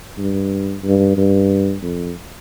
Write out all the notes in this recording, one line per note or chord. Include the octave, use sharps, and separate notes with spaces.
G2
G2
G2
F2